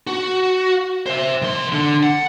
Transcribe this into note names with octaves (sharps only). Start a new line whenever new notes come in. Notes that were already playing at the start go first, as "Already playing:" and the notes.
F#4
C5 E5
D#3 C6
D3
F#5